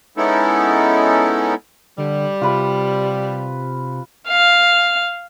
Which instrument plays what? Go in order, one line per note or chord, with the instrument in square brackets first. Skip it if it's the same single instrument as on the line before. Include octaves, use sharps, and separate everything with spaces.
[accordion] G#3 B3 C#4 D#4 E4 A4
[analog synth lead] D3 [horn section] G3
[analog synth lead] C3 [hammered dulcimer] F4 B4 G5
[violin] F5